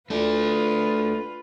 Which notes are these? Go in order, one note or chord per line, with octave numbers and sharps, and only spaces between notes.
A3 D4 F4 B4